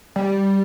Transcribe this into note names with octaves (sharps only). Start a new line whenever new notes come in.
G3